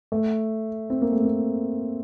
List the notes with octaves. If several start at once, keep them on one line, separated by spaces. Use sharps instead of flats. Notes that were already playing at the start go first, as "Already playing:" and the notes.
A3
C4
A#3
A3
A#3